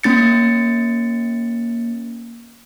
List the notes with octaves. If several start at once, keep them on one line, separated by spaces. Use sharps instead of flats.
A#3 C#4 A6 C#7